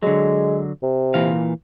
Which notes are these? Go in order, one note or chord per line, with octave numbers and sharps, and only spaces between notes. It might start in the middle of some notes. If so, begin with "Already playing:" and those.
D3 F#3 G#3
C3
A#2 E3 F5